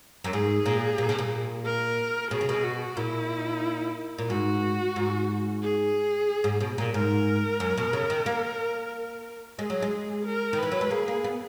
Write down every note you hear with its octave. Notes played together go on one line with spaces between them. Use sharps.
F#2
G#2 G#4
A#2
A#2
B2
A#2
A#4
B2 G#4
C#3
B2
F#4
A#2 E4
A#2
G#2 F#4
G#2
G#4
G#2
B2
A#2
G#2 A#4
F#2
B2
C#3
D#3
A#3
G#3 G#4
F#3
G#3
A#4
D#3
E3 B4
F#3
G#3
A#3 G#4
A#3
B3